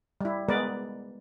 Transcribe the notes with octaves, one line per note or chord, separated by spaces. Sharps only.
G3 E4
G#3 B3 A#4 B4 D5